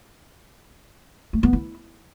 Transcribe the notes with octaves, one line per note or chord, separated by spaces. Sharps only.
A3
B3
E4